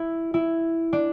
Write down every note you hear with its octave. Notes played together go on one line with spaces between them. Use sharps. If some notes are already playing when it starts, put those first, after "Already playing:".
Already playing: E4
E4
D4